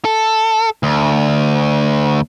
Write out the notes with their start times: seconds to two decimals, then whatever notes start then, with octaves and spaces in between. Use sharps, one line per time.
0.05 A4
0.83 D2